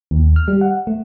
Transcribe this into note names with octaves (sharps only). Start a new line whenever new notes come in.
D#2
F6
G3
F#5
A3